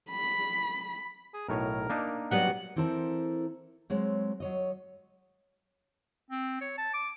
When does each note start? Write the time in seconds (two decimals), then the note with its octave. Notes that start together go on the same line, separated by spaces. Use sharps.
0.10 B5
1.34 G#4
1.48 B1 A2 A#4 C#5
1.90 A#3 D4 D#4
2.31 F#3 G3 B3 F#5
2.76 E3 C4 E4 A4 A#4 C5
3.90 F#3 G#3 C4 C#5
4.40 F#3 C#5 D#5
6.30 C4
6.61 C#5
6.78 A5
6.94 D6